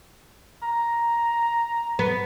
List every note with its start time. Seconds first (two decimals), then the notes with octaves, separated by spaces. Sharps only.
0.63 A#5
1.99 B3